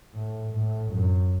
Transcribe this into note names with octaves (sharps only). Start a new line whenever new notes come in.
A2
A2
F#2